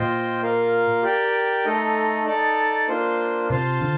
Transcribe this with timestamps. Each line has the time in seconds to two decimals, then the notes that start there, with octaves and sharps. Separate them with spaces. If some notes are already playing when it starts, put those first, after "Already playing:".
Already playing: A#2 F4 C5 D#5 G5
0.42 A#3 F4 A#4 F5
1.03 G4 A#4 D5 G5
1.65 A3 D#4 A4 D#5
2.26 D#4 A4 D5 A5
2.88 A#3 D4 F4 C5
3.50 C3 F4 C5 F5 A5
3.82 D3